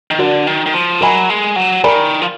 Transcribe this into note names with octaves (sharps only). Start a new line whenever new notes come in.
D#3
D3 F#4 A#4 D5
D#3
D#3
F3
F#3 A#4 D#5 G#5 B5
G#3
F#3
D#3 A#4 D5 G#5 B5
F3